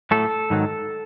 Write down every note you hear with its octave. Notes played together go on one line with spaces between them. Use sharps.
A2 F#3 A3 A4
G#2 D#3 F#3